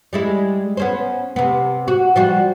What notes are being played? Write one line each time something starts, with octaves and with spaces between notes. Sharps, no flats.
G3 G#3 E4
B3 C#4 C5
C3 B3
F#4
F3 G3 F#4